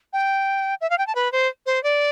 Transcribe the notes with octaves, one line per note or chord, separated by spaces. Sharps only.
G5
E5
F5
G5
A5
B4
C5
C5
D5